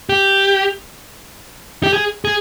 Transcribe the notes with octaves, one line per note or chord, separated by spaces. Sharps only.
G4
G4
G#4
G#4